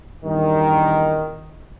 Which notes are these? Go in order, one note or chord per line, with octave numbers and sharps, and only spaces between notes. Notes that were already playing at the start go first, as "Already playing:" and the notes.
E2 G2 A#2 D#3